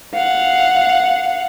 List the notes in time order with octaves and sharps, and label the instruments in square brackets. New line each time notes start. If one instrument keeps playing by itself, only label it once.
[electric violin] F5 F#5